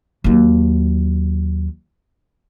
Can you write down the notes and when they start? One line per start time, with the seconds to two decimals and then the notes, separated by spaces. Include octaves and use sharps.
0.24 D#2 F#3